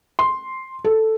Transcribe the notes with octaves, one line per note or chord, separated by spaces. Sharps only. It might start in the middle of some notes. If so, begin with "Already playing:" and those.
C6
A4